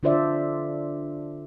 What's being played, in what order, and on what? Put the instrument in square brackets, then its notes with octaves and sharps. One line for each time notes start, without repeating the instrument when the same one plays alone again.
[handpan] D3 D4 F4 C5 D5 E5